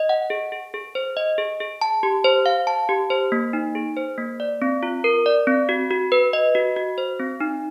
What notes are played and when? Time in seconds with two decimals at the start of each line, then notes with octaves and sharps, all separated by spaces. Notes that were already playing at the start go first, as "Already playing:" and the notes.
Already playing: D#5
0.09 F#5
0.30 G#4
0.52 G#4
0.74 G#4
0.95 C5
1.17 D#5
1.38 G#4
1.60 G#4
1.81 A5
2.03 G4
2.24 C5
2.46 F5
2.67 A5
2.89 G4
3.10 C5
3.32 A#3
3.53 D#4
3.75 G#4
3.97 C5
4.18 A#3
4.40 D5
4.62 C4
4.83 F4
5.04 A#4
5.26 D5
5.47 C4
5.69 F#4
5.91 F#4
6.12 B4
6.33 D#5
6.55 F#4
6.76 F#4
6.98 C5
7.19 C4
7.40 D#4